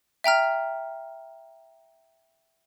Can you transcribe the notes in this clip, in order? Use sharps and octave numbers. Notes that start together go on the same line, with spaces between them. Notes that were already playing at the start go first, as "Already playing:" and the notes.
E5 G5 A#5 F6